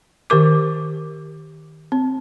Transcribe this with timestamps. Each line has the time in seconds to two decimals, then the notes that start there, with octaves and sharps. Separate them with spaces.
0.30 D#3 G4 A#4 D6
1.92 C4